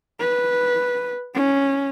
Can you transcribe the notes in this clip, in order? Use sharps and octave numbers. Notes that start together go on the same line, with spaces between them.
B4
C#4